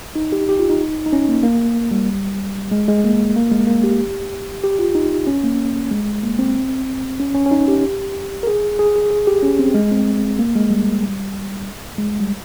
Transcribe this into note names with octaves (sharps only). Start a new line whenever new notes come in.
D#4
G4
G4
F4
D#4
D#4
C#4
A#3
A#3
G3
G#3
G#3
A#3
A#3
G#3
A#3
G4
G4
F4
D#4
C#4
A#3
G#3
A#3
C4
C#4
C#4
C#4
D#4
G4
A#4
G#4
G#4
G#4
G#4
G4
C#4
C4
G#3
C4
A#3
G#3
G3
G#3
G3